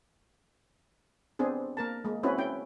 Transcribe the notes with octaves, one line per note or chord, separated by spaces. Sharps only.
B3 C4 D4 G#4
A#3 A#4 A5
G#3 A#3
C4 C#4 E4 F#4 B4
C#4 E4 G5